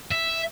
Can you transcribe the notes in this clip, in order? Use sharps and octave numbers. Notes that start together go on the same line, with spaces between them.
E5